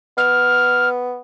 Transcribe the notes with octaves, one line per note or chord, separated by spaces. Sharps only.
B3 F6